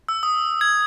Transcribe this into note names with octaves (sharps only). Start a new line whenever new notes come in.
E6
D#6
G#6